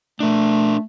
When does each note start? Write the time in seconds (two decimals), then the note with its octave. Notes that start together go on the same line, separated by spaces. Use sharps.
0.20 A3 D4 A#4